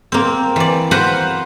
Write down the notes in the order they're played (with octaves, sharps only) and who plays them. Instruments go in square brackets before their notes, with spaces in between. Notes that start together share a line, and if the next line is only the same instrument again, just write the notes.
[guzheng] A#3 C4
E3 D5
B4 C5 F5 F#5 A#5